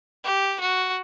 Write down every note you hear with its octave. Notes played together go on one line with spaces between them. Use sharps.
G4
F#4